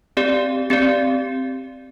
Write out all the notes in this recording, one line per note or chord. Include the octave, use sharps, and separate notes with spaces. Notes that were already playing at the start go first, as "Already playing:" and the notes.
C4 G4 D5
C4 G4 D5